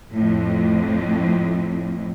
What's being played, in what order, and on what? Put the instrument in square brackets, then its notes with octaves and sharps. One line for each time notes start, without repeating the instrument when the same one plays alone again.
[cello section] F2 A2